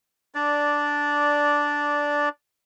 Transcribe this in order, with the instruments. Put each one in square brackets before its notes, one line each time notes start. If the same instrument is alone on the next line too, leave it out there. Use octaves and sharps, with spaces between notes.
[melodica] D4 D5